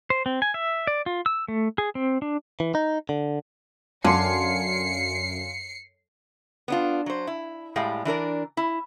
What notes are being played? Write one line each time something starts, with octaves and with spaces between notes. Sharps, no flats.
C5
C4
G#5
E5
D5
F4
E6
A3
G#4
C4
D4
E3
D#4
D3
F#2 D3 F5 G#5 C6 C7 C#7
B3 D4 F4
F#3 C5
E4
A2 G3 G#3 F5
E3 D4 A#4 D5
E4